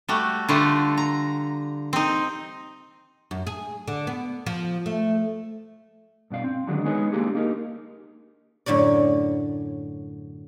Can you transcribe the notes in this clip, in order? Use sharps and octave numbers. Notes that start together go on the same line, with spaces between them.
G3 A3 F#4
D3 G3 A3 F4 F#4
A#5
C4 D#4
F#2
G#4
D3
B3
F3
A3
G2 B2 D4 F5
C4
D3 D#3 F#3 G#3 D4 F#4
G#3 B3 D#4 G#4 B4 C#5
A#3 D4 G4 G#4
A#3 D4 D#4 G4 A#4
F#2 A2 D3 C#5 D5